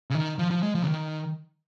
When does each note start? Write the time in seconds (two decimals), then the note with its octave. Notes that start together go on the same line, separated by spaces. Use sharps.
0.10 C#3
0.15 D#3
0.39 F3
0.51 F3
0.63 G#3
0.75 F3
0.82 C#3
0.86 D#3